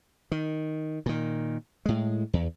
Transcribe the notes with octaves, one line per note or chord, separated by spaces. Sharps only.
D#3
A#2 D#3
A2 G#3
E2